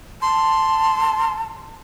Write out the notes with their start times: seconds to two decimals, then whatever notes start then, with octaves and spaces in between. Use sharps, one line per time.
0.22 A5 C6